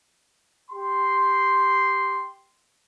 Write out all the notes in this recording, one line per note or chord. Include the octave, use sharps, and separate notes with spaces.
G4 C6